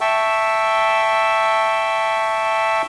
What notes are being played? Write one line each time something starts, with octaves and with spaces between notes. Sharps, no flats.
E5 G5 A5 C#6 E6